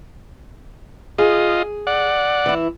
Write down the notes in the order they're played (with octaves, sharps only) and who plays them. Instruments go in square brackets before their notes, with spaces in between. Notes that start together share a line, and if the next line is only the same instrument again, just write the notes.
[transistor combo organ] F4 D#5 [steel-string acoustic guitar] G#4
[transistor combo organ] D5 F#5
[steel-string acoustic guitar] E3 E4